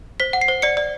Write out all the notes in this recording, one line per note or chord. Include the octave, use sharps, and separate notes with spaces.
C5 B6
F#5
C7
C5
D5 C#7
D5